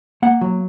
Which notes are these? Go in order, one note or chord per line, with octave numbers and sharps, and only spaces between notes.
A#3 F#5
F#3